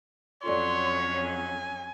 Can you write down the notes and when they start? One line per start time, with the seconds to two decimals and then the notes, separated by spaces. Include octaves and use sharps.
0.43 F2 F#3 C#4 F4 A4 C#5 D5 C6
1.16 G#5